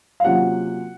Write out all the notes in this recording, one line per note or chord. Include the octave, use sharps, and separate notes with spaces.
F5
C3 F#3 A#3 C#4 F4 F#5